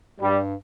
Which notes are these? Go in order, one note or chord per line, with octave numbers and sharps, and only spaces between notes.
G2 G3